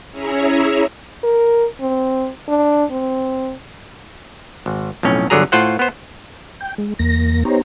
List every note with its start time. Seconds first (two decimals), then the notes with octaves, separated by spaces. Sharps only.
0.11 C#4 E4 G#4 C#5 E5 A#5
1.24 A#4
1.80 C4
2.48 D4
2.91 C4
4.66 G#1
5.03 B1 F2 A2 C#4
5.30 G1 D3 F#3 G#4 A#5
5.52 A2 F4 C5 F#5
5.79 B3 C5
6.61 G5
6.78 G#3
6.99 E2 A#3 A#6
7.45 B3 D#4 G4 C5 C#5 A#5